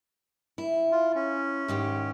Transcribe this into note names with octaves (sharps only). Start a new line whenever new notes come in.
E4
F4
C#4
G#2 D#3 G4